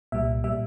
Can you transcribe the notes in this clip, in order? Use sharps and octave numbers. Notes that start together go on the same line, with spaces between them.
C2 A#2 G3 E5
A#2 G3 E5